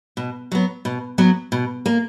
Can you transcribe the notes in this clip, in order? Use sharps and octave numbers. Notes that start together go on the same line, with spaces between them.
B2
F#3 B3
B2
F#3 B3
B2
A#3